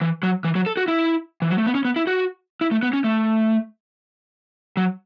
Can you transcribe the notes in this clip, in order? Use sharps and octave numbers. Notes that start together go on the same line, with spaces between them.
E3
F#3
E3
F#3
A4
F#4
E4
E3
F#3
A3
B3
C#4
B3
E4
F#4
E4
A3
B3
C#4
A3
F#3